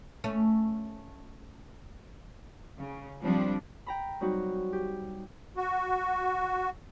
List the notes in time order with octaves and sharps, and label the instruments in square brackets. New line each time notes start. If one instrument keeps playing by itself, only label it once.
[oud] A3 C#4
[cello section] C#3
F3 G3 C4 D4
[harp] G5 A#5 B5
F#3 G3 C4 D#4 F#4
G4
[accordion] F#4